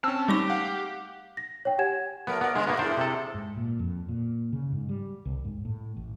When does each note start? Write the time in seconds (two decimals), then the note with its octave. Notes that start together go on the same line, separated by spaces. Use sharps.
0.04 C4 C#4 A5 E6
0.28 G3 A3 D#4 G4 C#6
0.50 F5 F#5
1.37 A#6
1.65 C#5 G5
1.78 G4 F#5 G#5 G#6 E7
2.27 F#3 A3 B3 A#4
2.41 B3 A#4 D5
2.56 C#3 G#3 B3
2.67 A2 A#3 B3
2.79 G3 D4 E4 G#4 A#4 C5
2.97 C3 A4
3.34 G#2
3.57 A#2
3.79 F2
4.09 A#2
4.53 C#3
4.72 G#2
4.89 G3
5.25 C2
5.45 G#2
5.65 A2
5.97 A1